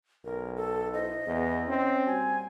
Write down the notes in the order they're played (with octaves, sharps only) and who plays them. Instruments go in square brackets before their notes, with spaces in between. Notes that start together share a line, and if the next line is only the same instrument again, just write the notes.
[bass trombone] B1 [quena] A#4
[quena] A4
[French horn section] E4 C5 [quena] D#5
[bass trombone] E2 [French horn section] B3 G#4
[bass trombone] C4 [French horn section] C#4
[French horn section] A#2 G3 F#4 [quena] G#5